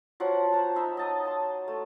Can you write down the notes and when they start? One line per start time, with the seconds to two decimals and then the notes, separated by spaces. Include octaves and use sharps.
0.20 F3 F#3 F#5 A5
0.52 C5 A5 A#5
0.76 D#4 E5
0.97 D#5 A5 D#6
1.25 A5 C6
1.68 A3